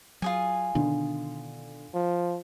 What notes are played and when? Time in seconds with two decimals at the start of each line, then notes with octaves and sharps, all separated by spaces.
0.22 F#3 F4 G#4 G#5
0.75 B2 D3 D#3
1.94 F3